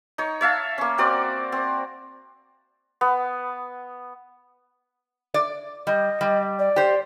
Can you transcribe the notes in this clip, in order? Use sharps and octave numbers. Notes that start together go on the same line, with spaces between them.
D#4 C#5
C#5 E5 F5 A5
A#3 C#4
C4 F#4 A#4 D5
C4
B3
D5
G3 D#5
G3
D5
G4 C5